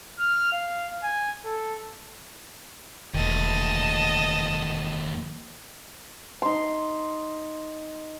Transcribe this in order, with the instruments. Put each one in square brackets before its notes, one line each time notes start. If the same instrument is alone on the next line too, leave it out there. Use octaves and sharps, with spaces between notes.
[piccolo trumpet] F6
F5
G#5
A4
[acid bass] E1 [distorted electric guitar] D#2 A3 [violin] D#5 A5
[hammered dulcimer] D#4 C6